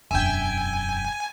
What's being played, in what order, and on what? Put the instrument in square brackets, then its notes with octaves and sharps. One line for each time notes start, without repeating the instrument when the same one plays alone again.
[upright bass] E1 F#2 [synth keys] E5 G5 [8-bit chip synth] G#5